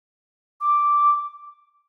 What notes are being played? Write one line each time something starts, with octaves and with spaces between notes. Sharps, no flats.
D6